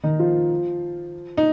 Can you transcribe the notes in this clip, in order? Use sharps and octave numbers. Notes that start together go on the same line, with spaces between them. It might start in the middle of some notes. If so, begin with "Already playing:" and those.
D#3 D#4
F3 F4
D#4